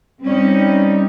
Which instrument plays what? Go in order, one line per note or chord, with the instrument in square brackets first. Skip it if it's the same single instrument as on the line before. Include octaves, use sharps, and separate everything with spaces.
[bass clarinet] G3 [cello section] C4 C#4 D#4